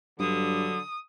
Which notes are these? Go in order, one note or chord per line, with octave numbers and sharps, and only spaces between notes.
G2 D3 F#3 D#6